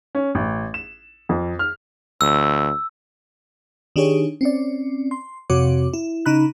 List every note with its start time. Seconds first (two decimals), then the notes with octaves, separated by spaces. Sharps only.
0.15 C#4
0.35 A1
0.74 E7
1.29 F2
1.59 F6
2.21 D2 E6
3.96 D#3 D4 D#4 G4 G#4 C#5
4.41 C4 C#4 D5
5.11 C6
5.50 F2 C3 F#4 C#5 D6
5.94 E4
6.26 C#3 D#4 A#5 B5 F#6